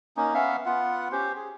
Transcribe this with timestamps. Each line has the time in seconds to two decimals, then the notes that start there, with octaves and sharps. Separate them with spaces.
0.17 A#3 C#4 D#4
0.34 B3 C#4 E5 F5
0.66 B3 F4 F#5
1.12 C#4 G4 C5
1.37 G#4